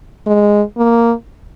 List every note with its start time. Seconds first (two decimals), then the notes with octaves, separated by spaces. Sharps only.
0.26 G#3
0.77 A#3